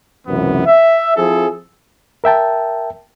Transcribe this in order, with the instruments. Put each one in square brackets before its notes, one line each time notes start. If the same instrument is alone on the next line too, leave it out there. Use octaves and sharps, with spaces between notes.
[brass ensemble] C#2 F#2 C3 E3 B3
E5
F3 C4 E4 G#4 A4
[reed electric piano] A#4 E5 G5 A5